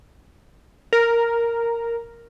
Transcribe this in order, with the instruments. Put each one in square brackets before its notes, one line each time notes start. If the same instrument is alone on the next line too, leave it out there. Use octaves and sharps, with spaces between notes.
[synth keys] A#4